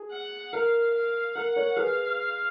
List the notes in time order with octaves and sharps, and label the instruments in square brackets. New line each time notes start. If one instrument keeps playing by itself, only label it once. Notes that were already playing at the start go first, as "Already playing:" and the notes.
Already playing: [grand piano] G#4
[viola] F#5
[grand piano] A#4 [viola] F5
[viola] F5
[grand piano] A#4 [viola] F#5
[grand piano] A#4 C#5
[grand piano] G#4 B4 [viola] F5